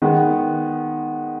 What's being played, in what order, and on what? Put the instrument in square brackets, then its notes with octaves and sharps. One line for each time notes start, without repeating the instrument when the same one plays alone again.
[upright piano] D#3 G#3 B3